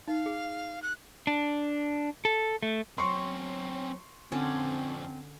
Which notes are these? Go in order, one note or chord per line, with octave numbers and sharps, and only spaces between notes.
D#4 F5
G#4
F#6
D4
A4
A3
F#3 C4 C#4 C6 C#6
F2 D3 C4 C#4 D5